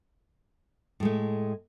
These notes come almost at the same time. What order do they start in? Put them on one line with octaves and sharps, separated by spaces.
A2 G#3 A3